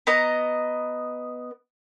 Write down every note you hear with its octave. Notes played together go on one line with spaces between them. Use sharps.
B3 D#5 A#5